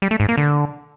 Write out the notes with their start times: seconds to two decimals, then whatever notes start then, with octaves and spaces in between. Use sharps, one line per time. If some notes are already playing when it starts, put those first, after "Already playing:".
0.02 G3
0.11 A3
0.20 G#2
0.29 A#3
0.37 D3